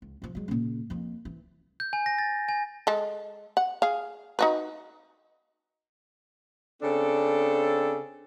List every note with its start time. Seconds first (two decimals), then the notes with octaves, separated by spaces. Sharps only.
0.02 C#2
0.22 C2 F3
0.35 F#3 G#3
0.48 A#2 C#3
0.90 F2 A#3
1.25 E3 C4
1.80 G6
1.93 G#5
2.06 A#6
2.18 A6
2.49 G#5
2.87 G#3 A4
3.57 F#5
3.82 G#4 F5
4.39 D#4 F#4 B4
6.82 C#3 C4 D4 A4